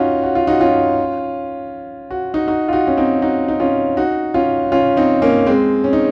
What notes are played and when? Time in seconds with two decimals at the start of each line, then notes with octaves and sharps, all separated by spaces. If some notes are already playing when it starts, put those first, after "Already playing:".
Already playing: C#4 D#4 F4 F#4
0.23 F#4
0.35 F4
0.47 D#4 F#4
0.61 C#4 F4
2.11 F#4
2.34 D#4 F#4
2.48 D#4 F#4
2.68 F4
2.73 D#4 F#4
2.87 C#4
2.97 C4 D#4
3.22 D#4 F#4
3.48 D#4
3.60 C#4 F4
3.97 D#4 F#4
4.34 C#4 F4
4.72 C#4 F4
4.97 C4 D#4
5.22 A#3 C#4
5.47 G#3 C4
5.84 C#4
5.93 D#4